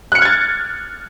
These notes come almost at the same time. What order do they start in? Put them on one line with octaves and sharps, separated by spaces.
F#6 C#7 F6 G#6 A6